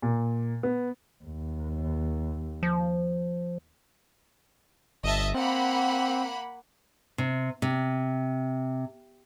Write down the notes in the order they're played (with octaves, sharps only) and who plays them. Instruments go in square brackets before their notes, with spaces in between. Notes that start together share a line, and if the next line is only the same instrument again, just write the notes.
[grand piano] A#2
B3
[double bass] D#2
[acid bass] F3
[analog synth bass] G1 [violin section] D#5 E5 A5
[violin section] A#3 F#5 B5 [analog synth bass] C4
[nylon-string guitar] C3
C3